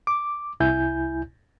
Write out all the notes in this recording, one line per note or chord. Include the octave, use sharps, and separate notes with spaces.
D6
C2 E4 G#5 G6